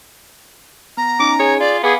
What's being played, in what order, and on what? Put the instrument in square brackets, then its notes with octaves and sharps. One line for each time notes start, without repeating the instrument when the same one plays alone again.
[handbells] B3 [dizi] A#5
[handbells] C#4 D#4 D7 [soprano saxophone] D6
[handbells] G#4 G#5 G#6 [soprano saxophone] C#5
[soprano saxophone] F4 [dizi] D5
[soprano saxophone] B3 [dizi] G#4 [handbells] F5 G#5 D6